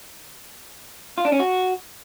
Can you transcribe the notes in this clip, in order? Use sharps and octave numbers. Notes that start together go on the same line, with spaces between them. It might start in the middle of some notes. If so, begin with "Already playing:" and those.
F4
D4
C#4
F#4